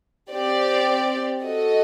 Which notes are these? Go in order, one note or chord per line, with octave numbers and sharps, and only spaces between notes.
C4 G4 D5
F#4 A4 D#5